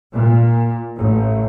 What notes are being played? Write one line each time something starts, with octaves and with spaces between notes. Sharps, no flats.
A#2
A1